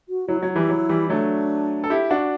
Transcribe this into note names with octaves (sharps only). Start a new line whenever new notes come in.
F#4
F#3 E4
F#3 F#4
E3 G3 E4
F#3
E3 G3
F#3 A3 D4
A4
E4 G4
D4 F#4